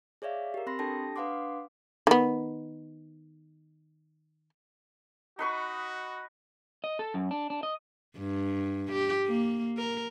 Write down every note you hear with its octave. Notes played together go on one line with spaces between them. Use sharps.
G#4 C#5 D5 E5 F5
G4 A#4
C4 B5 C6 A#6
D4 G4 A4 G5 A5 A#6
D4 B4 F5 F#5 C6 D6
D#3 B3
D#4 F#4 B4 C#6
D#5
A4
F#2
D4
D4
D#5
G2
G4
A#3
A#4